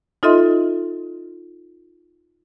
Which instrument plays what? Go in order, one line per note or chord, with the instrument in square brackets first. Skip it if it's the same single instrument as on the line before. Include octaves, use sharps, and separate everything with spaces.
[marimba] D#4 F4 A4 D#5 E5 C6